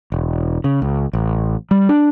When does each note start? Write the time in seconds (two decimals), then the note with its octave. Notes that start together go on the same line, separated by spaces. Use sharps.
0.12 E1
0.64 C#3
0.82 C#2
1.13 A1
1.71 G3
1.89 D4